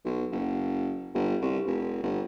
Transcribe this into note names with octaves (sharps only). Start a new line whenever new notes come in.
B1
F#1
G1
C2
F1
G1